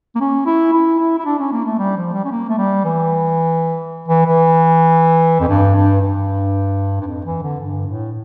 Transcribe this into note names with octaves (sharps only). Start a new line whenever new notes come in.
A#3
C#4
E4
E4
E4
E4
D4
C#4
A#3
A3
G3
F3
G3
C#4
A#3
A3
G3
E3
E3
E3
F2
G2
G2
G2
G2
F2
E3
D3
G2
A2